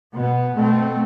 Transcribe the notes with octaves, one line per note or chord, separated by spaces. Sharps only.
B2 B3
B2 A3 C4